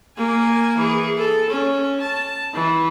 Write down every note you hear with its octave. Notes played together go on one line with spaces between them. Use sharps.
A#3 G#5
E3 G#4
A4
C#4
A5
E3